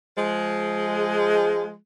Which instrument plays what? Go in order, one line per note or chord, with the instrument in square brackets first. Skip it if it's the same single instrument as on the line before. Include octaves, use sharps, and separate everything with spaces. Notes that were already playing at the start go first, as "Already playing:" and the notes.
[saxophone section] F3 G#3